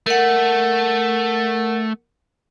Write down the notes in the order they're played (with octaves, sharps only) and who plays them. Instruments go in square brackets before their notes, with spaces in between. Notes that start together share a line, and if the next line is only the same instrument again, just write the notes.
[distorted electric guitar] A3 [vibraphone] A#4 F#5